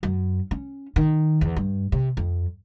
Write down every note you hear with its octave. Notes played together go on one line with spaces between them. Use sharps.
F#2
C#4
D#3
E2
G2
C3
F2